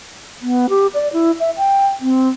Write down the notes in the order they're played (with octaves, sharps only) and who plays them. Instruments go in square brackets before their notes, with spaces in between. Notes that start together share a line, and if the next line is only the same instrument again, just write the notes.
[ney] B3
G4
D5
E4
E5
G5
C4